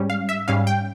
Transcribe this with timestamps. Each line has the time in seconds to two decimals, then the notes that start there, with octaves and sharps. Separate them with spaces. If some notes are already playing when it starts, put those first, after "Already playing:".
Already playing: G#2 G3 C#4
0.10 F5
0.29 E5
0.48 G#2 G3 C#4 F5
0.67 G5